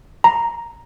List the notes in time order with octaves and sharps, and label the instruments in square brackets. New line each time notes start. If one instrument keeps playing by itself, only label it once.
[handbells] A#5